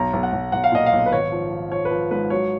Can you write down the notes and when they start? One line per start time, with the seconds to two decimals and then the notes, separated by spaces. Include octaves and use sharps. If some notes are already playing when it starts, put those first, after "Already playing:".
Already playing: B1 A#5
0.13 B1
0.23 F#5
0.33 B1
0.52 B1 F#5
0.64 F5
0.72 A#2 D#5
0.86 F5
0.93 B1
1.06 B4
1.12 G#1 C#5
1.32 F3
1.51 F3
1.71 F3 C#5
1.85 B4
1.91 F3
2.11 G#2 B4
2.30 F#3 C#5